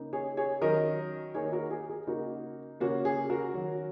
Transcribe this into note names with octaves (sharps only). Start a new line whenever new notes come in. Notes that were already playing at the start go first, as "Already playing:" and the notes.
Already playing: C#3 A#3 D#4
G#4 C#5
G#4 C#5
D#3 F#3 C#4 A#4 D#5
D#3 A#3 D#4 G#4 C#5
F#4 A#4
G#4
G#4
C#3 A#3 D#4 F#4
C#3 A#3 C#4 F#4
G#4
F#4 A#4
D#3 F#3 C#4